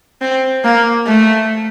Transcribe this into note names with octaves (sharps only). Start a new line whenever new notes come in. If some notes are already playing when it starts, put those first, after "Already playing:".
C4
A#3
A3